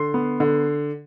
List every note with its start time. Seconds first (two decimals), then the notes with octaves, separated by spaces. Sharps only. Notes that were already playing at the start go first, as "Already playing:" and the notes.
Already playing: D3 C6
0.14 B3
0.40 D3